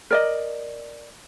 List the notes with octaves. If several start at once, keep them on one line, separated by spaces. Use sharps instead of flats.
A#4 D5 D#5